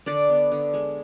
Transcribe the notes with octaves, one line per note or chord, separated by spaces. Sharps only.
D3 D4 D5
B3
D3
G#3